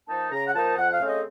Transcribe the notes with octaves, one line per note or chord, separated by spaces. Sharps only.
F3 A#3 D#4 A5
C#3 A#5
F#5
F3 A#3 D#4 A5
F2 F#5
F5
C#3 A3 C4
D#5